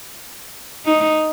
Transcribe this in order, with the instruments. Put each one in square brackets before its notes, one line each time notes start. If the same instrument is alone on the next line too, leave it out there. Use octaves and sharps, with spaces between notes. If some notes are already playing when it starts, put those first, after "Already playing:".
[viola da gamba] D#4